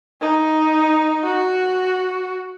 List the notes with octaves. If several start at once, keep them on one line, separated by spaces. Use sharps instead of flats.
D#4
F#4